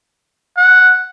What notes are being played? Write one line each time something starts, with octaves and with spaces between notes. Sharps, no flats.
F#5